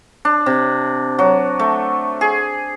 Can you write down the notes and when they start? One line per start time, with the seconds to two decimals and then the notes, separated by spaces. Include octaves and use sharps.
0.25 D4
0.46 C3
1.19 F#3
1.59 A3
2.21 G#4